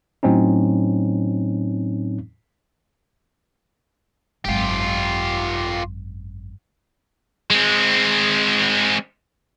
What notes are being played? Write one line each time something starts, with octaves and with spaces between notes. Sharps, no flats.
A2 F#3 C4 C#4 D#4
G#1 F#2 F4 G4
G#3 C4